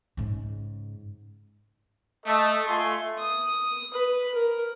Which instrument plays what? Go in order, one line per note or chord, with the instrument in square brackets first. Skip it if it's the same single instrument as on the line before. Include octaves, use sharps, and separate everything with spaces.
[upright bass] G#2 C#3
[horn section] A3 [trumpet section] A4 D#5
[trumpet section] A3 [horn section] F4 G#5 C6
[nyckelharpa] D#6
B4
A#4